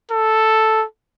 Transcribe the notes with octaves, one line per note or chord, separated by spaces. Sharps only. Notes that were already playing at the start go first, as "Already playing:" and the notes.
A4